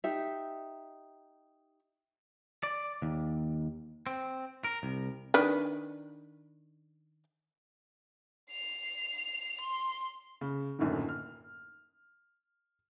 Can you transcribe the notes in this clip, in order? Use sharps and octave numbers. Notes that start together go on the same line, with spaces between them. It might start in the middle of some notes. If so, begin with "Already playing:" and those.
D#4 G4 E5
D5
D#2
C4
A#4
C2
D#3 D4 B4
C7 F7
C6
C#3
D#1 B1 F#2 A2 D3 D#3
F6